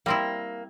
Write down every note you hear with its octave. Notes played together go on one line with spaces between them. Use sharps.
G3 A#3 C4 E4